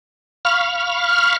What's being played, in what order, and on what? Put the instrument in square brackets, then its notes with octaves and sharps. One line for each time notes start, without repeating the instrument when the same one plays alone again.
[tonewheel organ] F5 B5 C#6 F6